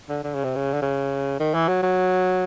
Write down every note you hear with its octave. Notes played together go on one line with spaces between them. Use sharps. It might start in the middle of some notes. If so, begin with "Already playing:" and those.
D3
D3
C#3
C3
C#3
D3
C#3
D#3
E3
F#3
F#3